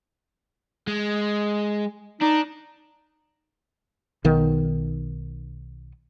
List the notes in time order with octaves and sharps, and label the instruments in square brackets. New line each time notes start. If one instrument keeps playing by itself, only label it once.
[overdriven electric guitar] G#3
[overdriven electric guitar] D4 [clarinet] D#4
[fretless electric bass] B1 D#3 B3